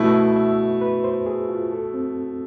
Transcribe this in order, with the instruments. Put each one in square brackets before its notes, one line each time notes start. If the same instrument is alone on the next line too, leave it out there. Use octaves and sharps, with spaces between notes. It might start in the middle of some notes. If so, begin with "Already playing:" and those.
Already playing: [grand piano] B2 A3 E4 [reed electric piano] B4
[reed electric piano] E5
E5
B4
C5
G#4
F4
A4
C4